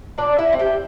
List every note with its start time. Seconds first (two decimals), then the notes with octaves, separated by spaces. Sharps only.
0.18 A#2 D4 D5
0.38 E4 E5
0.49 A3 C4
0.59 G4 G5